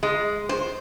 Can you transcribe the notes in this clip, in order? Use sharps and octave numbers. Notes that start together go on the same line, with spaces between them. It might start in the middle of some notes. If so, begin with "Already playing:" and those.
G#3
C5